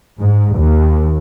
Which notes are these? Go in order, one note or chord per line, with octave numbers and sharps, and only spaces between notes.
G#2
D#2